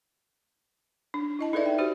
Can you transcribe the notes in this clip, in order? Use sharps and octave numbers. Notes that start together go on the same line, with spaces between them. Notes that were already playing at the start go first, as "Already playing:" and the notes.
D4
E4 D#5 A5
D#4 G#4 A4 B4 D5 E5
G5
D#4 F#4 G4 C5